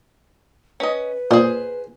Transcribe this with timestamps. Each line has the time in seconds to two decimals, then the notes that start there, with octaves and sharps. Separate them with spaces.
0.80 C#4 B4 D#5
1.31 A#2 G#4 C5